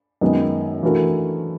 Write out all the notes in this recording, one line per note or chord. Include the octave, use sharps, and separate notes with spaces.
F#2 D#3 G#3 B3
E3 A3 D4 F#4 A#4